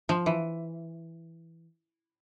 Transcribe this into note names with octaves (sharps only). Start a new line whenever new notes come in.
F3
E3